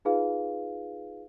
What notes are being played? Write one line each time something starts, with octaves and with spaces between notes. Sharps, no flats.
D#4 F4 G#4 B4 F5